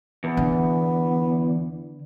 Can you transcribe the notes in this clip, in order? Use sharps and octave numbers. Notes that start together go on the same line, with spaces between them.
E2 B3
D3